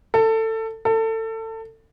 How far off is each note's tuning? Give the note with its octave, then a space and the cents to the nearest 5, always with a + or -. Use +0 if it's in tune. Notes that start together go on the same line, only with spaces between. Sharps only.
A4 +20
A4 +25